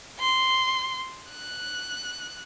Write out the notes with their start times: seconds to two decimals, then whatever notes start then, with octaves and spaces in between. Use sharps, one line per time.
0.20 C6
1.31 F#6